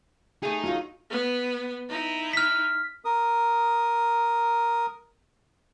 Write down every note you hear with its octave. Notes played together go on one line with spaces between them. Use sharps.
A3 D#4 G#4
F#3 F4
B3
D#4 E4
F6 B6
A#4 D#6